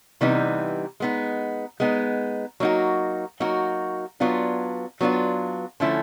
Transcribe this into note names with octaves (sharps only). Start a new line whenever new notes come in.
C3 E3 G3 B3 D#4
G#3 B3 D#4
G#3 B3 D#4
F#3 A#3 D#4 F#4
F#3 A#3 D#4 F#4
F#3 B3 D4 F4
F#3 B3 D4 F4
D3 F3 A3 C#4 E4